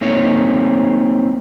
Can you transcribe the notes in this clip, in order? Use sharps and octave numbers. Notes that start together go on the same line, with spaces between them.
A3 A#3 C4 D#4 C#5